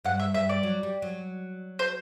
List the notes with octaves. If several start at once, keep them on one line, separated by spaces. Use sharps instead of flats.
G2 F#5
E5
G2 E5
D5
F#3
G3
F#3
C5